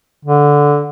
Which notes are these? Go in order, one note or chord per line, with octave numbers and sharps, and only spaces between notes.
D3